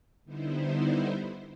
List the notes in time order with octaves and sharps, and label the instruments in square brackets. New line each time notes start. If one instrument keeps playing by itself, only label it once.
[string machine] D3 G3 B3 D#4 E4 C5